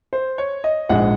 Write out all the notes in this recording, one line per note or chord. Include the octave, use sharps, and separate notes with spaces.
C5
C#5
D#5
A#1 G#2 F3 G#3 F#5